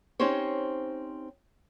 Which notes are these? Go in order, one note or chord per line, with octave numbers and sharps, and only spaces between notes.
C4 C#4 D#4 G4 C5 C#5